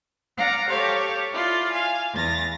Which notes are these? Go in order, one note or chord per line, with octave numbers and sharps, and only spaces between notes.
D5 F5 F#5 A#5 D6
G4 A4 C#5 F5 C#6
E4 F4 D5 C6
F5 G#5
E2 A6 A#6